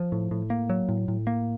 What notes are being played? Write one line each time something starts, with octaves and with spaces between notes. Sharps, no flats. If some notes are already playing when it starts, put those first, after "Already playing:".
Already playing: F3
A2
A2
A#3
F#3
A2
A2
A#3